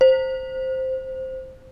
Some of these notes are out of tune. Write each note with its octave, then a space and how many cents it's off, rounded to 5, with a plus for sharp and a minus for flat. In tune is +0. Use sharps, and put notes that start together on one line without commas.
C5 +0